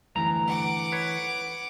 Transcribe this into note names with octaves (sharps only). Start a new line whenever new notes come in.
D2 G2 E3 A3 A#5
F#5 D6
B4 C#5